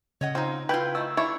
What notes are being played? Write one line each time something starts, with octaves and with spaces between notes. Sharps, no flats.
C#3 C#5 D#5 F#5
C4 D#4 F4
E4 F4 B4 G5 G6
D#3 A3 E6
D4 E4 C#5 E5